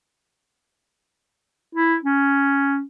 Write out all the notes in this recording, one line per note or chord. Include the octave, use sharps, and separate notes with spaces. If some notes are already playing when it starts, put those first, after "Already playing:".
E4
C#4